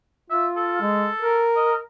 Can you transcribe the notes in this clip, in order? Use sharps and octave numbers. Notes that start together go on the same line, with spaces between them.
F4 E5
A4
G#3
A#4
D#5